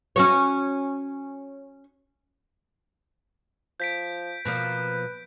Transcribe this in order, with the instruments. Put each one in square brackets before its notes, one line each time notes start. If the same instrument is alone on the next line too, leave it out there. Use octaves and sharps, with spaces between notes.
[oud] C#4 F#4 C#5
[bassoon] F3 [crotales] G6 B6 D7
[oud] B2 F3 A#3 [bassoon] B4